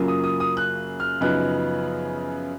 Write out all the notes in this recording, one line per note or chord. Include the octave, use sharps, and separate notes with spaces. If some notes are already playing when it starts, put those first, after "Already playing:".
Already playing: F#2 C#3 F#3 A#3 F4
D#6
D#6
D#6
F#6
F6
F#2 C#3 F3 B3 D#4 F#6